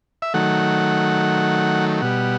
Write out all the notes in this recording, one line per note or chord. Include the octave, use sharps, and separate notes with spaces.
E5
D#3 F#3 A3 F#5
B2 G3 F#5